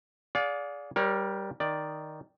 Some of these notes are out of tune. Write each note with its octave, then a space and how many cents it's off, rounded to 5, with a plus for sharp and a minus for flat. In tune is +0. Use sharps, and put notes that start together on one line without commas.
G#4 +0 D5 -25 F5 +35
G3 +0 A#4 +25 C#5 -20
D#3 +0 D5 +0